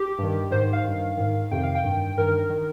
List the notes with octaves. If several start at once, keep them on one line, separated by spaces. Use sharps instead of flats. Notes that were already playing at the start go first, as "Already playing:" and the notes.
Already playing: G4
G2 D#3
G#2 D#3 C5
F5
G2 D#3
G#2 D#3
F2 C3 D#3 G5
F5
G5
G2 D#3
G2 D#3 A#4
D#3